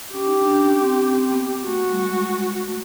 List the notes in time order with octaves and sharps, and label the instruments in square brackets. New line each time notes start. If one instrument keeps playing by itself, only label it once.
[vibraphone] C#4 [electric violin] G4
[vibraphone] D#4
D4
D4
C#4
C4
C4
C4
B3
[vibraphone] A3 [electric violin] F#4
[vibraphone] A3
G3
G#3
A3